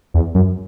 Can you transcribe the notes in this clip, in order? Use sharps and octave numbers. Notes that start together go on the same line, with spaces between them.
E2
F#2